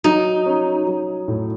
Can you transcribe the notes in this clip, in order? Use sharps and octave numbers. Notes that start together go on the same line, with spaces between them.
F#3 D#4
C#4
F#3
A2